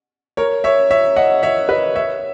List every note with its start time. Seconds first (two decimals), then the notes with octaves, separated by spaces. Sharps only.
0.37 A#4 C#5
0.64 C#5 E5
0.91 C#5 E5
1.16 D#5 F#5
1.43 C#5 E5
1.69 B4 D#5
1.95 C#5 E5